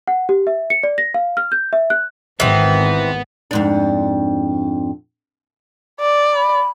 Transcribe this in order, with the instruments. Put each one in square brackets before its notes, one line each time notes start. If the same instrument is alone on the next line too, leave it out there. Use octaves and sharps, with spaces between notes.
[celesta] F#5
G4
E5
C#7
D5
A#6
F5
F6
G6
E5
F#6
[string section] G#1 [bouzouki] E3 C4 [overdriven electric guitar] B3
[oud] F2 G#2 D4
[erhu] D5
[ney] B5